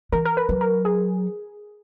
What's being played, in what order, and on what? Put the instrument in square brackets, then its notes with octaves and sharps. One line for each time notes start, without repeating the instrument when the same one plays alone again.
[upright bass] E3 [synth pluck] A#4
[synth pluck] A#4
B4
[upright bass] F#3
[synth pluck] A#4
G#4